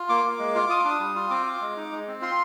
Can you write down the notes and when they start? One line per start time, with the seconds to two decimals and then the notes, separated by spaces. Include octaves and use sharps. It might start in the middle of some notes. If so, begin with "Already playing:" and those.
Already playing: F4
0.09 A#3 D6
0.24 A#3
0.39 G#3
0.55 F4
0.69 F4 D#6
0.80 D4 D6
0.90 D#6
1.00 G3
1.15 F4
1.30 C4 D6
1.46 F4
1.61 G#3
1.77 D#4
1.92 G#3
2.07 C4
2.21 F4 C6